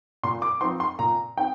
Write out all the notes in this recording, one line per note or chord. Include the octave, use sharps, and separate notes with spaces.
A#2 C6
D6
F3 C4 D#4 C6
C6
A#2 A#5
C4 D#4 G5